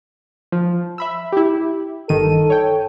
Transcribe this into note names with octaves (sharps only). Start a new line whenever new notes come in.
F3
E5 B5 E6
E4 G4
G1 D#3 A4 D#7
C#5 G5